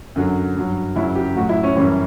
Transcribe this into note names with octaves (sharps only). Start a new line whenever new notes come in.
F#2 D3 F#3
G2 F#3
F#2 C#3 F#3 E4
G4
A2 F#4
F#3
E4
C#4
F#2 C#3 E3 G3 C#4